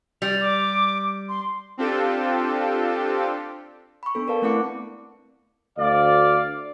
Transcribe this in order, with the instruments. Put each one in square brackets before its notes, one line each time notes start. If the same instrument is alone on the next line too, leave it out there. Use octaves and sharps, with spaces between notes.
[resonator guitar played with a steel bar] G3 [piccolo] F7
[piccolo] D6
C6
[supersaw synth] C4 D4 F4 G4 A4
[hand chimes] B5 C#6
B3 D4 A4
A#4 B4 D5 F5 A5
A3 C4 E4 F#5 D6 C#7
[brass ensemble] D2 D5 F5